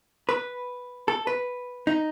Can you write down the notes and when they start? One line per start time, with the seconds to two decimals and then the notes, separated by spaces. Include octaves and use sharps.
0.29 B4
1.08 A4
1.27 B4
1.87 D#4